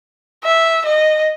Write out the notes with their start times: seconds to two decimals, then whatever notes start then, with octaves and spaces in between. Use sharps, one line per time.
0.44 E5
0.85 D#5